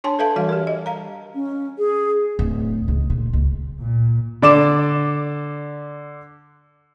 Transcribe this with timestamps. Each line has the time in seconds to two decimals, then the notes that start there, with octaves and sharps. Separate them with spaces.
0.04 D4 C#5 G#5 A5 C6
0.19 A4 B4 E5 F5 A5
0.36 E3 G3 F#4 E5 F5
0.49 G4 A#4
0.67 D#5
0.86 F5 A#5
1.35 C#4
1.78 G#4
2.39 D1
2.88 C#2
3.10 A#2
3.33 C#2
3.80 A#2
4.42 D3 D5 D6 E7